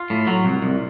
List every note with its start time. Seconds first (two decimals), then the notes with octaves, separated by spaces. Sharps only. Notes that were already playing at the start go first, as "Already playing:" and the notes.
Already playing: F4
0.10 A2
0.27 F#3
0.45 C2
0.62 C2